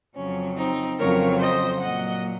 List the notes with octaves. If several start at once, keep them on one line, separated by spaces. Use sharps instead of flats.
F2 C#3 F#3 C#4
C4 D#4
F2 C#3 F#3 A#4 C#5
C5 D#5
A#2 F#3 D#5 F#5